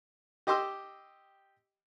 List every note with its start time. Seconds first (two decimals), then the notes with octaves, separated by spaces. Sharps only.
0.47 G4 D#5 G5 C6 D6 E6